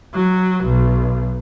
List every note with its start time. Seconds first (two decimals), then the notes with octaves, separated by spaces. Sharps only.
0.13 F#3
0.64 B1